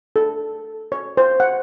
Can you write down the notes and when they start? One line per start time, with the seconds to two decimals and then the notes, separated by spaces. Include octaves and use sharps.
0.16 A4
0.92 C#5
1.17 C5
1.40 F#5